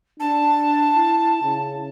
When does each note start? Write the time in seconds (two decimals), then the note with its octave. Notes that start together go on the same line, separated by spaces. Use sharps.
0.20 D4 A5
0.96 E4
1.43 C#3